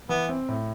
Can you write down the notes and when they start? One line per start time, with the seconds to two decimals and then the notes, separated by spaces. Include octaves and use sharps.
0.09 E3 B3
0.29 C4
0.49 A2